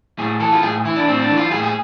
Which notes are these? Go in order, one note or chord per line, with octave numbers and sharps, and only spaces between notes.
A2 G#4
E3 A4
F4
A2 G#4
E3 E4
D4
A2 C4
D4
E3
F4
A2 G#4
G#4